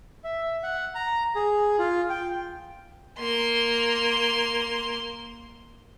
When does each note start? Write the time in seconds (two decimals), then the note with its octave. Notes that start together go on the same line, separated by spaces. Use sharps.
0.24 E5
0.63 F#5
0.95 A#5
1.35 G#4
1.79 F4
2.09 G5
3.18 A#3 C6